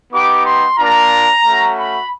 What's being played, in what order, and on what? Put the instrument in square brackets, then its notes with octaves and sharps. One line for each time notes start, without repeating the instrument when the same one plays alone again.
[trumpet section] B3 D#4 G4 D6
C6
A#3 D4 F4 A#5
A3 C#4 F#4
B5